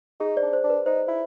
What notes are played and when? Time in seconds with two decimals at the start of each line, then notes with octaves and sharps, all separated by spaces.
0.20 D#4 G#4
0.36 C5 D5
0.42 D4
0.53 C5
0.64 D4
0.70 B4
0.86 D#4 C5
1.08 E4